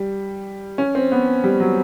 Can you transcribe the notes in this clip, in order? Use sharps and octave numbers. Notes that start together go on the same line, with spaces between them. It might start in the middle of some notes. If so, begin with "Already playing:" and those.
Already playing: G3
C#4
C4
B3
G3
F#3